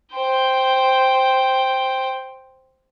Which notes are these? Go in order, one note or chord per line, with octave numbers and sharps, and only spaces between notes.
C5 G5